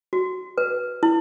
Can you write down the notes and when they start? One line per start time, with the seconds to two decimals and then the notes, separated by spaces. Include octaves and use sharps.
0.13 F#4
0.58 B4
1.03 E4